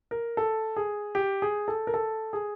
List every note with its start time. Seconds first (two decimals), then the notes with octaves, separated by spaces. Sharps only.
0.11 A#4
0.37 A4
0.76 G#4
1.15 G4
1.42 G#4
1.68 A4
1.87 A#4
1.94 A4
2.33 G#4